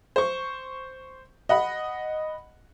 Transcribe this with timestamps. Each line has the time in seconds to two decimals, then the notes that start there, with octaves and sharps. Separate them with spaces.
0.16 C5 C#6
1.49 D#5 F#5 B5